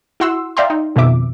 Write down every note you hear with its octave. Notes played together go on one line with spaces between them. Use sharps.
E4 F#4 F#5 C6 E6
D5 E5 F5 G5 A#5 C6
D#4
F2 B2 D#3 F3 E5 D6